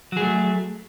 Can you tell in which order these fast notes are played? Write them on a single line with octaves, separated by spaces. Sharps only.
F#3 G#4 A3